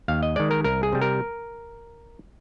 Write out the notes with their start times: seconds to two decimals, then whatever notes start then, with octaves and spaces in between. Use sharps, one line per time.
0.08 D#2 F5
0.23 D#5
0.36 D#3 G#3 D5
0.51 A#4
0.64 C2 A#4
0.83 G#4
0.93 C3 G3
1.01 A#4